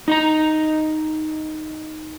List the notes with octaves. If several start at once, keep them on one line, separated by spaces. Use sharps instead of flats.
D#4 D#5 A#5